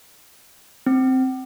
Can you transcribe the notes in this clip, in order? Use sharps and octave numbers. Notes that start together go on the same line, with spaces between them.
C4